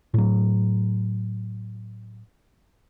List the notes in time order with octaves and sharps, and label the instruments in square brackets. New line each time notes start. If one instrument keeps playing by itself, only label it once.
[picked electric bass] A2 F#3